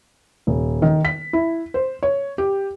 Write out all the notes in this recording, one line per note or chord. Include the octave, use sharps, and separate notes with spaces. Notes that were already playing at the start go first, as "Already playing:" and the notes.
D#1
D#3
B6
E4
C5
C#5
G4